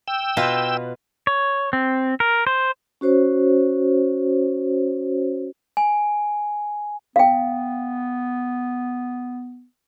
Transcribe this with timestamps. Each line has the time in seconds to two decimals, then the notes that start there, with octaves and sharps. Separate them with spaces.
0.08 G5 E6
0.37 B2 F4 B4
1.27 C#5
1.73 C4
2.20 A#4
2.47 C5
3.01 C#4 F#4 C5 C#5
5.77 G#5
7.16 B3 F5 G5